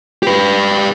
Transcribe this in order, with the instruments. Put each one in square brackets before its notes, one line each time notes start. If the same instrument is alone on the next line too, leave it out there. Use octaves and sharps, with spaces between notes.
[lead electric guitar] G4 B4